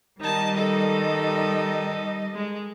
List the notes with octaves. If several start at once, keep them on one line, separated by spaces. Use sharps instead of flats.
D#3 G3 D#4 D#5 A5
D#4 A4
G#3